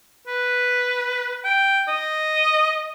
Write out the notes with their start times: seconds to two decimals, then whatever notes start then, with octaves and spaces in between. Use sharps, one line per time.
0.27 B4
1.44 G5
1.88 D#5